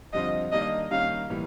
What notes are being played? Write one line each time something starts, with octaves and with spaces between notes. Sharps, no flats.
F2 D3 G3 C4 F4 D#5
D#3 G3 A#3 D4 D#5
D#3 G3 A#3 C#4 F5
A2 E3 G3 A#3